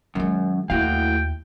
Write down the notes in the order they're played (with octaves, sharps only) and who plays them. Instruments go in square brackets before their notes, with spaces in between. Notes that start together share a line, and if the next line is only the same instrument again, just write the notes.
[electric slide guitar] F#2 [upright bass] D#3 G#3
[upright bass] D#2 E4 [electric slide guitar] A2 F#4 F5 [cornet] G5